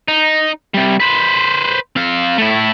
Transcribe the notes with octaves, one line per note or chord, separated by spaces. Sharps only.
D#4
C3 G3
B4 C5
C4 F5
A3 E4